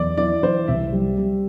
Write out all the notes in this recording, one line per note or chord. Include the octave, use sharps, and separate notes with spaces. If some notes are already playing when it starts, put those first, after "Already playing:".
Already playing: E2 D5
E3 D5
E3 C5
C2 E5
G3
G3